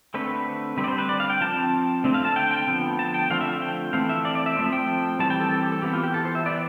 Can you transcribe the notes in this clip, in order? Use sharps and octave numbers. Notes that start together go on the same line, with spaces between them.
D3 A3 C4 B4
D3 G3 C4 B4
D5
C5
B4
D5
F5
G5
F3 C4 A5
D3 A3 C4
F5
A5
G5
G5
D3 F3 B3
A5
G5
D3 F3 A3 C4 F5
E5
G5
E3 A3 C4 F5
E5
D5
D5
E5
F3 A3 C4
G5
E3 G3 C4 A5
G5
A4
A4
G4
A4
E3 B3 G4
F4
G4
A4
C5
E5
E3 B3 D5